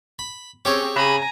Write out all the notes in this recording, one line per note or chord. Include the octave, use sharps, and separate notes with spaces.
B5
C4 C#4 G4 G#4 C#5
C#3 G#5 A#5 B5